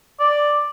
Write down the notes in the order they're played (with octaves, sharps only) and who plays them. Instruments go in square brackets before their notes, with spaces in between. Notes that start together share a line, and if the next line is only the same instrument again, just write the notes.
[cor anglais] D5